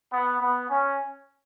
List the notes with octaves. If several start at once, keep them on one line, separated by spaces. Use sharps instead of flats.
B3
B3
C#4